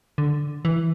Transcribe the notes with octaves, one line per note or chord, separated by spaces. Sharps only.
D3
E3